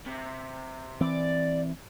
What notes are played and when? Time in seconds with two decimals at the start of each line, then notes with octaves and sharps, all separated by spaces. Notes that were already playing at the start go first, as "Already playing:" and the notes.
0.06 C3
1.01 E3 C4 D5